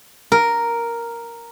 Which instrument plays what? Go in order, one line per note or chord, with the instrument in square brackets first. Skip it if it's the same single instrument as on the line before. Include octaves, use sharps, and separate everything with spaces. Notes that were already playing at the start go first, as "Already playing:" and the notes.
[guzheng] A#4